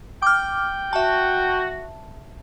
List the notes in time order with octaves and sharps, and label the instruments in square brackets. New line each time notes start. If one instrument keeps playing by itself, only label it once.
[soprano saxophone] G5 [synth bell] D6 F6
[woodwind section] F#4 [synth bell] E5 A5